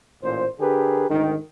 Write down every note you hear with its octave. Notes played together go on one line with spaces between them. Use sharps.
A1 A#2 C5
D3 G4 G#4 A#4 B4
D2 G#2 D#3